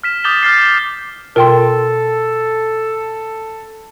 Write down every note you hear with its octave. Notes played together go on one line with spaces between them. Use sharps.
F6 B6 E7
D6 D#6 G6 A6 E7 G7
D6 F6 G6 A6 B6 C7
B2 F4 A4 A#4 G5 C6